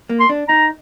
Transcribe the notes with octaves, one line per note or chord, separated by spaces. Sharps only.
A#3
C6
D4
D#4 A#5